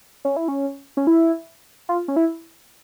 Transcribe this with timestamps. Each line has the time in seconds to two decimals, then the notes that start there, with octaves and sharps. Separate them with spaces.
0.25 C#4
0.37 E4
0.48 C#4
0.97 C#4
1.07 E4
1.89 F4
2.08 C#4
2.16 E4